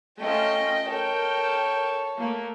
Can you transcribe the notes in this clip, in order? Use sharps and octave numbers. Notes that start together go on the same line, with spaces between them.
A3 C#4 F4 D#5 G5
A4 A#4 C#5 G5
A3 A#3